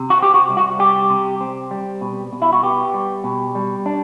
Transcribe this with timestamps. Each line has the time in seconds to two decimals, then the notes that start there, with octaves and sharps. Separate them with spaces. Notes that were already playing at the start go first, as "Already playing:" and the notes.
Already playing: C3
0.10 F#4
0.18 C4 G4
0.34 F#4
0.49 C2
0.57 F#4
0.79 G3 G4
1.10 C3
1.41 C4
1.71 G3
2.01 B2
2.33 B2
2.42 E4
2.53 F#4
2.63 B3 G4
2.94 G3
3.24 B2
3.55 G3
3.86 D4